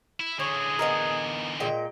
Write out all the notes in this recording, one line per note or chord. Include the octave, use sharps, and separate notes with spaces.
E4
D3 E3 G#4 C#5
B3 D#4 A#4
A#2 G#3 G5